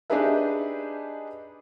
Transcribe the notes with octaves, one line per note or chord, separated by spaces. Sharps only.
D4 D#4 G4 G#4 B4 E5